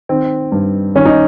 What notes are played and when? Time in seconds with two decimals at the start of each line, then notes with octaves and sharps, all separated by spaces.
0.09 D#3 C4
0.52 G2
0.95 D#3 C#4
1.05 D#4